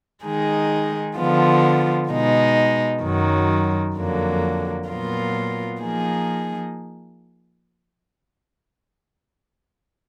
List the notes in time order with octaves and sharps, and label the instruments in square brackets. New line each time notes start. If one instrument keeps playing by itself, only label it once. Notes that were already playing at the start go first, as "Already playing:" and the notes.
[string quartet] D#3 G#3 D#4 G#4
D3 F3 B3 F4
B2 G#3 D#4
F#2 D#3 F#3
F2 D3 F#3 A#3
A#2 F#3 B3 F4 A#4
F3 A#3 D#4 G#4